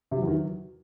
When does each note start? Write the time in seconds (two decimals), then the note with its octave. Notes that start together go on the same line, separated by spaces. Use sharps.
0.11 C3
0.17 F#3
0.22 E2
0.28 D#3
0.33 F#3